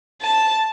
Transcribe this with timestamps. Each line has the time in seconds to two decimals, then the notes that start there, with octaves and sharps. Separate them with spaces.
0.22 A5